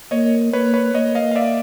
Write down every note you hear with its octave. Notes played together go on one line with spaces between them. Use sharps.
A#3 C#5 D#5
A#3 B4 C#5
B4 C#5
A#3 C#5 D#5
D#5 F5
F5
D5 E5